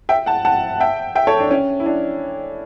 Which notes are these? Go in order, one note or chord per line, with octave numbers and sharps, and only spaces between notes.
E5 G5
F#5 A5
F#5 A5
E5 G5
E5 G5
A4 C#5
D4
C#4
E4
D4